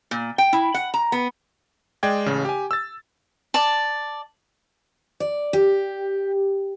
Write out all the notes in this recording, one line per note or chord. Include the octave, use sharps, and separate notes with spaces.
A#2
G5
E4
F#5
A#5
B3
G#3 D5 G5 G#6
A1 C#3
G4 G#5
E6 A6
D5 A5
D5
G4